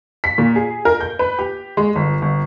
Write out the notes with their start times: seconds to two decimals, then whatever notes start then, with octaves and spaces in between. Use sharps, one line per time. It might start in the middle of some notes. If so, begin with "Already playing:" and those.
0.24 B6
0.38 A#2
0.56 G#4
0.85 A#4
1.01 G6
1.19 B4
1.39 G4
1.77 G#3
1.95 G1
2.22 G1